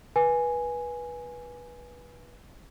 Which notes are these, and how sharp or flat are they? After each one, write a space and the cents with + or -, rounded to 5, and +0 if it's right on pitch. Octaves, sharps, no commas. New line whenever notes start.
B4 -20 G#5 +0